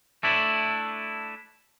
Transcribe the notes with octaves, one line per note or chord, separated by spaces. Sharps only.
A3 D4 E4